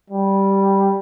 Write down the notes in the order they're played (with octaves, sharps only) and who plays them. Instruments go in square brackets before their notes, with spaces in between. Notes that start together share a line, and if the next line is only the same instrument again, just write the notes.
[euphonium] G3